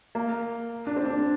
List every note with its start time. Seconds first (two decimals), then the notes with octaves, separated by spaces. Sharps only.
0.15 A#3
0.87 D4
0.96 C4
1.05 D4